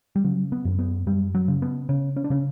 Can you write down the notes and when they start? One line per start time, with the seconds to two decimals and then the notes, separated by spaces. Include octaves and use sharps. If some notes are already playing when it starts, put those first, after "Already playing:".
0.16 G3
0.24 C#3 F#3
0.52 B3
0.65 F#2
0.79 B3
1.06 F#2 G3
1.35 F#3
1.48 C#3
1.62 B3
1.89 C#3 C#4
2.16 C#4
2.24 D4
2.30 C#3 C#4